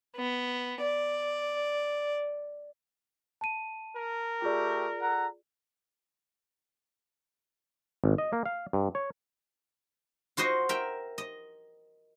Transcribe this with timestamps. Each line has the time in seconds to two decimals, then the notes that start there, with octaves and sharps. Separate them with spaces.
0.16 B3
0.82 D5
3.41 A5 D#7
3.96 A#4
4.42 A3 F4 G4 G#4 D5
5.01 A4 F#5 A#5
8.04 G#1
8.18 D#5
8.33 A#3
8.46 F5
8.73 G2
8.95 C#5
10.37 F4 F#4 C5 D#5
10.69 A#4 E5 G5
11.18 D#5